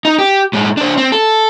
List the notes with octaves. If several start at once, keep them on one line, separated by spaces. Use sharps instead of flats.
D#4
G4
A2 G#3
D4 C5
C4
A4